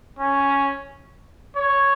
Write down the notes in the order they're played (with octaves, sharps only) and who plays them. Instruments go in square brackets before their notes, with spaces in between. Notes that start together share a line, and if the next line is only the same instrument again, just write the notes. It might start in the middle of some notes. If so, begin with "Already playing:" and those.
[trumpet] C#4
C#5